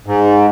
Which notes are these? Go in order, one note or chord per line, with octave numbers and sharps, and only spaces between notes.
G#2